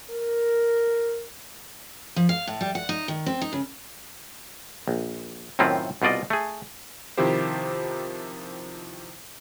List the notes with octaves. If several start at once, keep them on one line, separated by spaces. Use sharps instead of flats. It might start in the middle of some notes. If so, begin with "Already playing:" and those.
A#4
F3
F5
A2
G3
F#5
D#4
D#3
C4
D#4
C#3
A#1
F#2 A2 D#3 C4 E4 F4
C2 B2 F4 D5 D#5
A3 G#4
C3 D#3 F3 E4 G4 C5